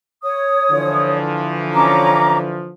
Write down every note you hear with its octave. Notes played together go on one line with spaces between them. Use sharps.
C#5 D#6
D3 E3 F3
C#4 A#5 D6